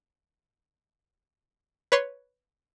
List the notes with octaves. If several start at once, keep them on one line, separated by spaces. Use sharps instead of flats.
B4 C#5 C6